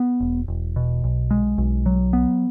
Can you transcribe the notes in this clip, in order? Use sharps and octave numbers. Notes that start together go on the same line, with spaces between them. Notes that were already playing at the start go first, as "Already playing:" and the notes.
Already playing: B3
E1
E1
B2
B1
G#3
B1
F#3
B3